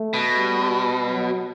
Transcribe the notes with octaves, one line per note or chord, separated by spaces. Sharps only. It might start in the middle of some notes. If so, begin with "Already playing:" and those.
Already playing: A3
B2
G3
F#3